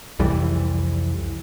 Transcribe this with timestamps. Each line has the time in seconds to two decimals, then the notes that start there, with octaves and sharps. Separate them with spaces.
0.19 C2 F2 E3 G3